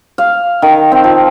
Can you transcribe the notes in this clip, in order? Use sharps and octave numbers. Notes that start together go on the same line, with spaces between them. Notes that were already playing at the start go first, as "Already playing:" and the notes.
F5
D#3
C4
F3